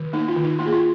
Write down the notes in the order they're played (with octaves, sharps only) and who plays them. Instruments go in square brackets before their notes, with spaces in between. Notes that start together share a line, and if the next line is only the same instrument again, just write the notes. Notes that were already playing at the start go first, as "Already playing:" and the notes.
Already playing: [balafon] D#3
A#3 D#4
F4
D#3
D#4
A#3 F4
G#4
F4